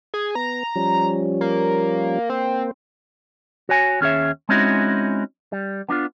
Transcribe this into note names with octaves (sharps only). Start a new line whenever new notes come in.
G#4 G#6
B3 A#5
F3 G3 C#4
A#3
A#3 C4 C5
F#4 C#5 G#5
D#2 C#4 G#4 C#5 E5
G#3 C4 C#4 D#4 E4 F#4
G3
B3 D4 D#4 F4